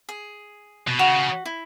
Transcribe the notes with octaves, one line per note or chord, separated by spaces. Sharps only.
G#4
B2
C#3 F#4
E4